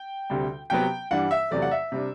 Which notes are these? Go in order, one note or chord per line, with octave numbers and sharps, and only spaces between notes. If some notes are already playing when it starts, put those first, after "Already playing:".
Already playing: G5
D2 C3 G3
C3 F#3 B3 G5
G2 E3 G3 D4 F#5
E5
E2 C3 F#3 A3 D5
F#5
E5
C3 G3 D4